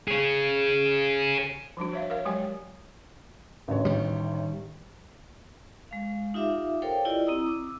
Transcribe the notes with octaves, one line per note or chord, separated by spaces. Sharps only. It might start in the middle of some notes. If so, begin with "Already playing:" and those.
G#4 C#5
F3 G3 D4 F#4
C#5 E5 F5
A#4 C#5 F5
F#3 G#3 G4 C#5 G5 G#5
A1 D2 C#5
D#3 G3
G#3 F5
D#4 F4 G4 E5 F5 D6
A4 A#4 C5 C#5 F5 G5
E4 F4 G4 D5 D#5
C4 E4 A#5 D#6 E6
D6 E6